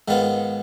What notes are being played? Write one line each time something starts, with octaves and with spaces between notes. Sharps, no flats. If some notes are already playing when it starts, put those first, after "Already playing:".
G#2 D#3 B3 F4